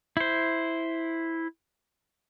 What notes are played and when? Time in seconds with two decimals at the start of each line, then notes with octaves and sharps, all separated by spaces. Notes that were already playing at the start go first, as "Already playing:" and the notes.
0.17 E4 C5